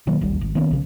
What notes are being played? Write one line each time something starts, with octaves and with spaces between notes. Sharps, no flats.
B2 D#3 F#3 A#3
D#1 G#1 D2 G3
G#1
D#3 A#3 B3 C#4
A#1 C#3